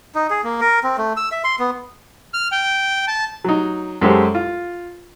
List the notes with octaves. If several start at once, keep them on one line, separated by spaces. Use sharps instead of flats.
D#4
G#4
A#3
A#4
C4
A3
E6
E5
C6
B3
F6
G5
A5
F#3 D#4
F#2 G#3 G4 A4 C5
F4